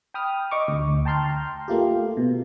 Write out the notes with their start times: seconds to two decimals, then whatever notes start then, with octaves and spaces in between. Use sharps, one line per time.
0.14 G5 B5 D#6 F6
0.51 D#5 C#6 D6
0.68 D2
1.05 G5 A5 A#5 C6 F6 G6
1.68 A3 A#3 F4 G4
2.17 B2